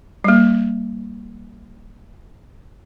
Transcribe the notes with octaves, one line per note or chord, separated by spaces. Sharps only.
G3 A#3